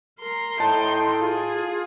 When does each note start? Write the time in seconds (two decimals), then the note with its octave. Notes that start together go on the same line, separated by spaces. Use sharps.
0.20 A#4 C6
0.60 A2 D#4 G5 A5 C6
1.20 F4 G#4